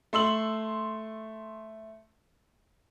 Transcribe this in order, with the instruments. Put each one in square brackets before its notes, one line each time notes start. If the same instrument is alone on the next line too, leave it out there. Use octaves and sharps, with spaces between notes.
[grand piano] A3 C6 E6 F#7